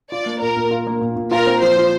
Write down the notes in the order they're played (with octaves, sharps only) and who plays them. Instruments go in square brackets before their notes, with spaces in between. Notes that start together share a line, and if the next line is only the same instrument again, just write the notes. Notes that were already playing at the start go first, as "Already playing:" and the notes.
[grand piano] F4 [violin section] D5
[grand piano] A#3
[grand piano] A#2 [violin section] A#4
[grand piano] A#2
F4
A#3
A#2
A#2
[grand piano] F4 [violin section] A#4
[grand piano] C4
[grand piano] F3 [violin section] C5
[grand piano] F3